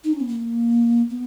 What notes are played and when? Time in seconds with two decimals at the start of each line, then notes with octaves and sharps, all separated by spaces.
0.04 D#4
0.13 C#4
0.20 B3
0.28 A#3
1.10 B3